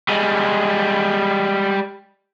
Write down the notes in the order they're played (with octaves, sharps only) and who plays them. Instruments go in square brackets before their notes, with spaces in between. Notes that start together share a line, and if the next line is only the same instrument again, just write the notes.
[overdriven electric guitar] G3 G#3